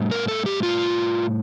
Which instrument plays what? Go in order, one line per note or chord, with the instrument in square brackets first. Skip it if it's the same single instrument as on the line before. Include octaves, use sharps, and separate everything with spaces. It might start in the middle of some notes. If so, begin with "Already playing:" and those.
Already playing: [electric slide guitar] A2 G3
A#4
A4
G4
F4